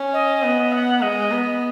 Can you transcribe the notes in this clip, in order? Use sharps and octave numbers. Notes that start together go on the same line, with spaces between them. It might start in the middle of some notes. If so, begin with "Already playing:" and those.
Already playing: C#4
D#5
B3
F#5
G#3 D#5
B3